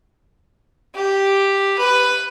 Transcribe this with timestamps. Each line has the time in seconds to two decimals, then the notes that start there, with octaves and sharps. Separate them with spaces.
0.95 G4
1.78 B4